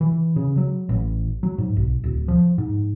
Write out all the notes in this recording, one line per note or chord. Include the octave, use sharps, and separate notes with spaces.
E3
C#3
F#3
A1
F#3
G#2
B1
D1
F3
G#2